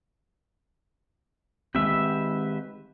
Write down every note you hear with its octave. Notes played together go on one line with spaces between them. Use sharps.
D#3 G#3 C4 G4 B4 E5